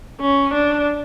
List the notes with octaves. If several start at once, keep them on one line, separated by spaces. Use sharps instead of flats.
C#4
D4